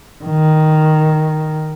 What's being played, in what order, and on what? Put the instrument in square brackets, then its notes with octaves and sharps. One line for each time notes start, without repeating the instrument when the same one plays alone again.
[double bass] D#3